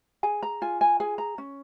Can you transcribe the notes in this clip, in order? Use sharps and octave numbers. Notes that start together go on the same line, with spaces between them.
G#4 G#5
A#5
F4 G#5
G#5
G#4 G#5
A#5
C#4